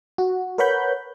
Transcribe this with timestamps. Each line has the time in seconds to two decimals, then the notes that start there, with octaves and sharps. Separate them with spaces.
0.18 F#4
0.58 A#4 B4 C#5 F#5 B5 G6